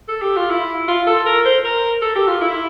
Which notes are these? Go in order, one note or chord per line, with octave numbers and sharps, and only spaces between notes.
A4
G4
F4
E4
F4
A4
A#4
C5
A#4
A4
G4
F4
E4